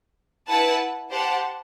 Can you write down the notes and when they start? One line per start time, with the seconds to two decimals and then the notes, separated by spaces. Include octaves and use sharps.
0.48 E4 B4 F#5 A5
1.10 G4 C5 F#5 A5